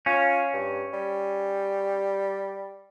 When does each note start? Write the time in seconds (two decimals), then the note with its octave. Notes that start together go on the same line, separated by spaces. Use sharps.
0.06 C#4 F4
0.53 G2
0.93 G3